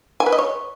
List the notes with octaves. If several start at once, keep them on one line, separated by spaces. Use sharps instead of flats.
G#5
B4
D#5
C#5